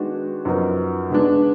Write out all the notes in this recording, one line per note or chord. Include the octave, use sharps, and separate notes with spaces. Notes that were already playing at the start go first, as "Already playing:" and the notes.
Already playing: D#3 G#3 B3 D4 F#4
F#2 F3 B3 D#4 A#4
D3 G#3 B3 D4